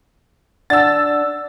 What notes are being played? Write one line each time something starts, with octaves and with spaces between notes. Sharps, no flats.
D4 D5 F#5 E6 A6